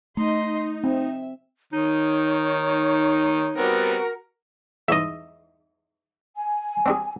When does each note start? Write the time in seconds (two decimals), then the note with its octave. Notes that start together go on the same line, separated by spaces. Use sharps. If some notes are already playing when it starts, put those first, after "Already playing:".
0.17 A3 D#4 D#5 C6
0.84 C4 E5
1.73 D#3 D#4 C#5
3.56 G3 B3 C4 F#4 A#4
4.88 E2 G#2 D#5 E5
6.36 G#5
6.86 C4 D4 G#4